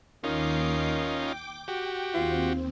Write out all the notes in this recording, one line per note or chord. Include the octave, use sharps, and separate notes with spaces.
D#2 D#3 C#4 D#4 F4 D6 C7
G5 D6
F#4 G4 G5
D#2 C4 F4